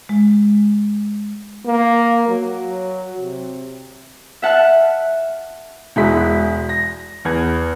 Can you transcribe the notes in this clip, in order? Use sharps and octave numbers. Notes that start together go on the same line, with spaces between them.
G#3
A#3
F#3
C3
E5 F#5 A5 F6
E1 G#3 E4 F#4 B6
A#6
E2 B4 G#6